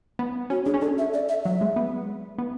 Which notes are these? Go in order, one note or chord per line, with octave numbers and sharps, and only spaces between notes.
B3
C#4 F#4
D4 G#4
C#4
D4 A4
E5
D5
E5
F#3 E5
G#3
B3
B3